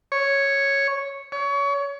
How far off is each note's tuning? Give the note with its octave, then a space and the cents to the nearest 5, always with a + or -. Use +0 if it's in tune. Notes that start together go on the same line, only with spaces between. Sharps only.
C#5 -5
C#5 +25